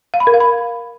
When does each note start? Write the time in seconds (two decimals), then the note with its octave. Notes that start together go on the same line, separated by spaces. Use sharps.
0.14 F5
0.20 B5
0.27 A#4
0.34 F5
0.40 B5